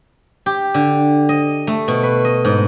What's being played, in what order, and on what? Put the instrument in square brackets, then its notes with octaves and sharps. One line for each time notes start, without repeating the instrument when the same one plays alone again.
[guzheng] G4
D3
D#5
A3
B2
B4
D#5
G#2